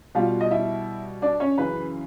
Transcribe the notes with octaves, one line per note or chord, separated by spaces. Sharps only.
B2 G3 F4 F5
D#5
E4 E5
D4 D5
C#4 C#5
F#2 C#3 E3 B4